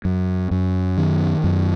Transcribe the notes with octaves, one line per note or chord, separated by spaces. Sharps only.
F#2
F#2
D#3
F#2